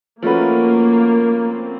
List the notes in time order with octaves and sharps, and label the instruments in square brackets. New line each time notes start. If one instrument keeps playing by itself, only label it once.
[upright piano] F3 A3 C#4 F#4 B4 [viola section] A#3
[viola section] C4